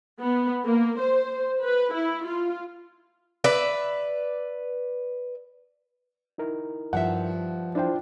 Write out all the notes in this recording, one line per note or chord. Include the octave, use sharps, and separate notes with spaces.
B3
A#3
C5
B4
E4
F4
B4 D5 E5
D#4 E4 A#4
G2 F3 E5 F#5
D4 E4 F4 C5 G5